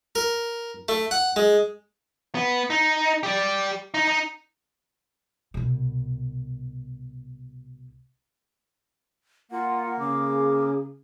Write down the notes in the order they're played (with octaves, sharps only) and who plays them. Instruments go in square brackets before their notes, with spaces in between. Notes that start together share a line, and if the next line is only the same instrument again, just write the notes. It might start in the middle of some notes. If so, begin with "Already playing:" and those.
[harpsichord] A#4
A3
F#5
G#3
[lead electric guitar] B3
D#4
G4 D5
D#4
D#4
[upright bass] C2 B2
[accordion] A#3 [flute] F4 [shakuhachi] F#5
[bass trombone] C#3 [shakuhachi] G#4 [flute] D6